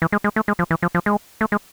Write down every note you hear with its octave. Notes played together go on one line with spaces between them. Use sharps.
E3
G#3
G#3
A3
G#3
F3
E3
F3
F3
G#3
A3
G#3